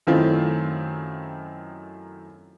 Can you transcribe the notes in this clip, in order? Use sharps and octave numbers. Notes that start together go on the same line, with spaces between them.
F#2 D#3 A3 C4 E4 F4